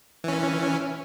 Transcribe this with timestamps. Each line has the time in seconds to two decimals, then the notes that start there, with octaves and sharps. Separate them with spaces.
0.24 E3 C#4